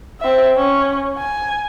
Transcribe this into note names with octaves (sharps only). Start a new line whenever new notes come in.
C4 E5
C#4
G#5